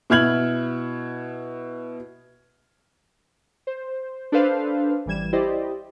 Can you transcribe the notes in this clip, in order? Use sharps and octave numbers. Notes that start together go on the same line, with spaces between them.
B2 E4 F6 G#6 F#7
C5
D4 A4 B4 C5 F5
A1 E3 G3 G#6 E7
E4 G4 C5 D5 D#5